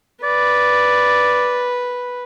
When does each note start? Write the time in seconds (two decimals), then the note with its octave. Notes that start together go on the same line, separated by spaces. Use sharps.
0.24 B4 D5